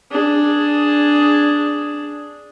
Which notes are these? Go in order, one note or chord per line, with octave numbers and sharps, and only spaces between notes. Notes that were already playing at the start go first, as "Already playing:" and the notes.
D4 G#4